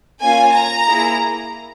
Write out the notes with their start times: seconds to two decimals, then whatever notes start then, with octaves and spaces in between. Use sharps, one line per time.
0.21 A#3 C#4 F4 G#5
0.55 A#5
0.87 A#3 E4 G#4